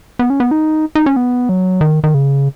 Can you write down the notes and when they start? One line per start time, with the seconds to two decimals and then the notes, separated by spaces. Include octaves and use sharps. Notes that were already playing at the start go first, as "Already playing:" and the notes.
0.19 B3
0.30 C#4
0.40 B3
0.51 D#4
0.95 D#4
1.06 C#4
1.16 B3
1.49 F#3
1.81 D#3
2.04 D#3
2.14 C#3